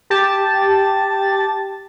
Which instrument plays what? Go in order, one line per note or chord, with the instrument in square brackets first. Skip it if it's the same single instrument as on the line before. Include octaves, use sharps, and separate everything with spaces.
[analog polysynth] G4 A5 A6